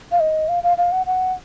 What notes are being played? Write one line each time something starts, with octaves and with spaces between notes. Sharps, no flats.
F5
D#5
F5
F5
F5
F#5
F#5